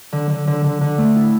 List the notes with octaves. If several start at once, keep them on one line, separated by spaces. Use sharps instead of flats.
D3
D3
D3
D3
D3
A3
E4